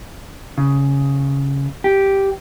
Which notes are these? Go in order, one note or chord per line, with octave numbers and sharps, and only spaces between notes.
C#3
G4